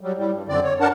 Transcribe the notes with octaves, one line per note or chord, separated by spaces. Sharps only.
F#3 G3
A2 G3
G2
F#2 D3 C4 D5
C#5
G2 D4 A#4 F#5 A5